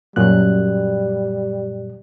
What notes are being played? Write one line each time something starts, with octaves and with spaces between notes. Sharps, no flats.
F#2 A#2 G3 F#6